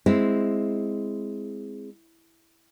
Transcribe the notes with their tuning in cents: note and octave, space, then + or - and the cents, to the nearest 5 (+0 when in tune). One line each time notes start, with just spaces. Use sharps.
G#3 +0 C4 +0 E4 +0